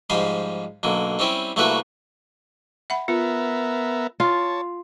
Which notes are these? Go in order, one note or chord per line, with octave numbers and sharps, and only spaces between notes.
G#2 F3 G3 B5 C6
B1 D3 A#3
G3 C4 C#4 E4 G4
C2 A3 A#3 E4 F#4 B4
E5 F#5 B5
B3 F4 A#4 E5
F4 C#5 A5